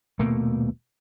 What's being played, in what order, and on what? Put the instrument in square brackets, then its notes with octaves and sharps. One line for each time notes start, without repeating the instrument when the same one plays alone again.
[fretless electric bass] D#1 B2 A3 A#3